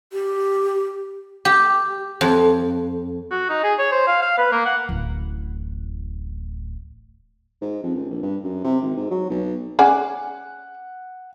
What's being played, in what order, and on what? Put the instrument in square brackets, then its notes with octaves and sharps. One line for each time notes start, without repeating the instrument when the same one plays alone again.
[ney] G4
[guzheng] G4
F2
[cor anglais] F#4
D#4
G#4
C#5
C5
F5
F5
B4
A#3
F#5
[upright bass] D1 A1
[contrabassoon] G#2
F2
C#2
A#1
G2
F#2
C3
G#1
G#2
F#3
B1
[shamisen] C#4 G#4 D5 [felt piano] F#5